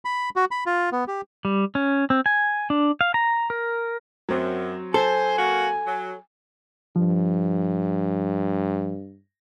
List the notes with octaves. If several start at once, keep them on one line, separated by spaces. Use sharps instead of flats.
B5
F#4
B5
F4
B3
G4
G3
C#4
C4
G#5
D4
F5
A#5
A#4
F#2 F#3 C4
A4 C5 G#5
A#3 F#4
F#3
G2 F3